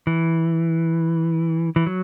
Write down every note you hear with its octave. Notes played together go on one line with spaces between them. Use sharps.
E3
E3
F#3